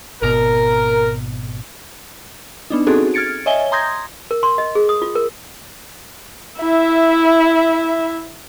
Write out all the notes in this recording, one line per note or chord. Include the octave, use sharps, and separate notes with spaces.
G#1 B2 A#4
B3 D4 D#4
C4 C#4 D#4 F#4 G#4 A4
F6 G#6 A6 C#7 D7
C#5 D#5 E5 G#5 G7
A#5 C6 D#6 G6 G#6 A#6
A#4
C6
D#5
G#4
D#6
F4
A#4
E4 E5